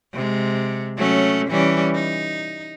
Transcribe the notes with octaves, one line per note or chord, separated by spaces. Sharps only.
C3 G#3
F#3 A3 C#4
E3 G3 C#4
D#4